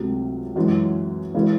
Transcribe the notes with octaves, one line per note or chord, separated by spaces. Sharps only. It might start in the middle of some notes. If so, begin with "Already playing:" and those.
Already playing: C#2 C3 F#3 A3
F#2 E3 G#3 C#4 F#4
C#3 E3 G#3 C#4 F#4